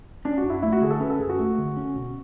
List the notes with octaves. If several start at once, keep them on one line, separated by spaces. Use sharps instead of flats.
C#4 D4
F#4
F#2
E4
A3 E4
F#4
D3 G#4
A4
C#4 B4
A4
F#2 G#4
F#4
A3
D3
C#4
B2